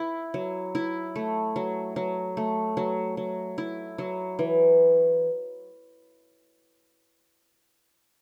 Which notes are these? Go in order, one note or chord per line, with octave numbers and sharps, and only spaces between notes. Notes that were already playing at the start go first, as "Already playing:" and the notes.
Already playing: E4
F#3
E4
A3
F#3
F#3
A3
F#3
F#3
E4
F#3
E3